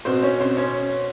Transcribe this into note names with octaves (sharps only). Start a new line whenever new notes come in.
B2 C4 C5
C#4 C#5
C4 C5
C#4 C#5